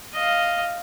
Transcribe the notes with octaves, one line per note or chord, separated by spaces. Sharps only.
D#5 F5